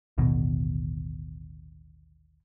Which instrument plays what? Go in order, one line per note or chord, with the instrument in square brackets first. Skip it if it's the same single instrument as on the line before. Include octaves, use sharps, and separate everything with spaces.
[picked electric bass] A1 D#2 B2 D3